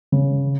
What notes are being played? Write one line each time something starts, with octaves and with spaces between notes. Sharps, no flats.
C#3